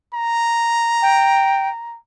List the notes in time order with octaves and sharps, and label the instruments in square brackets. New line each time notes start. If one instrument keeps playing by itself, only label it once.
[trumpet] A#5
[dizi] G5